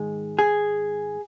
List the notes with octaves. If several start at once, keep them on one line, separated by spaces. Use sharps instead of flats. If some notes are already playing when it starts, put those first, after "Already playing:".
Already playing: G#2 D#3 G#3
G#4